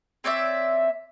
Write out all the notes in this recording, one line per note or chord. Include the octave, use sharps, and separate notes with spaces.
C4 C#5 D5 E5